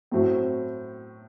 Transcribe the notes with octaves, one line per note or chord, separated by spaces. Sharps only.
A2 F#3 A3 C4